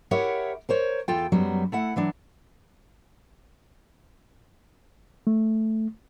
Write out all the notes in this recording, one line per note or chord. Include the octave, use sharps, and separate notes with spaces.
E4 G4 A#4 C#5 E5 F#5
A#4 C5 C#5
E2 F4 A4 G5
F#2 F#3 G3 B3
A3 E4 F#5
E3 F#3 D4
A3